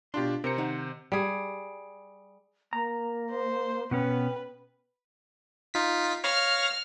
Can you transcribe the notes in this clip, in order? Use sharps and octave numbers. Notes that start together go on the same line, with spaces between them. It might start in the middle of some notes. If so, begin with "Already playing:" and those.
B2 D4 F4 G4 C6
C3 A#4 C5 C#7
D#3 D#4 F#5
G3 G#4
A#3 A#5
C5
B2 B3 C#4 B4 G5
D#4 F4 B6
C#5 F5 F6 A#6